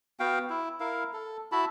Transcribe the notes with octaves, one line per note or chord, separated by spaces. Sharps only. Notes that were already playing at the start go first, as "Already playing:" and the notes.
B3 F#4 F5 G5
E4
E4 A#4 F5
A4
E4 F#4 A5 B5